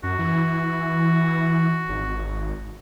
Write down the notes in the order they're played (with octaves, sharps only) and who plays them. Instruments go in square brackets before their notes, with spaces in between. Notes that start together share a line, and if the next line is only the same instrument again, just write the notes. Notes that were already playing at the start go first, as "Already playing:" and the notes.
[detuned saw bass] F#2 [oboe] F#4
[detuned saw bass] E3
G#1